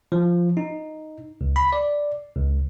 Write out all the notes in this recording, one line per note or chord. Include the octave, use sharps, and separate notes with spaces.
F3
D#4
C#2
B5
D5
C#2